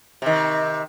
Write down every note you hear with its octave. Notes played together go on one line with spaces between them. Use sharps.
C3 D#3